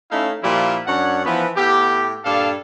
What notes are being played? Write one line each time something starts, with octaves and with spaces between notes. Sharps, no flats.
A3 C#4 D#4 E4 F5
A#2 F3 G3 E4 F4
F#2 D4 C#5 F#5
E3 F3 B3
A2 B3 G4
G2 A#2 D4 A4 F5